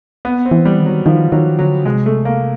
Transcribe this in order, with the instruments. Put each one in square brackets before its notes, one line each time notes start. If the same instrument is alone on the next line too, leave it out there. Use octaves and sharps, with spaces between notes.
[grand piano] B3
C4
[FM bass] E3
[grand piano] G3
[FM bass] D#3
[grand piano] F#3
[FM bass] D#3 [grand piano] F3
[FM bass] D#3 [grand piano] F#3
[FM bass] D3 [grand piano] F#3
[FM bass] C3 [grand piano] G#3
[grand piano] A3
A#3